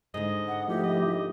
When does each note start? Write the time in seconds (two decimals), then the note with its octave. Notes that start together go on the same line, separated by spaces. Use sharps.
0.14 G#2 D3 D#5
0.48 F#5
0.68 F3 A3 E4 G4
0.83 D#5